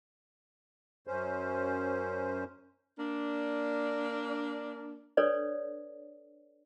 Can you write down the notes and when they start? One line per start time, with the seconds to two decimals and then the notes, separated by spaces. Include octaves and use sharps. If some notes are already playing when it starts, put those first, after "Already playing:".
1.07 F#2 C#4 C5
2.98 A#3 D4
5.17 D4 A4 B4 C#5 D5